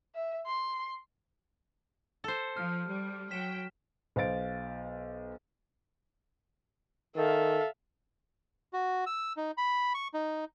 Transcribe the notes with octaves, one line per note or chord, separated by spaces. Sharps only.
E5
C6
A4 C5
F3 F6
G3
F#3 G5 B6 E7
B1 C5 F5 A6 D7
D#3 A4 E5 F5
F#4
E6
D#4
B5
C#6
D#4